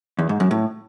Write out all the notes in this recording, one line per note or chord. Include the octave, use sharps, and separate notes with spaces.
E2
G#2
F#2
A2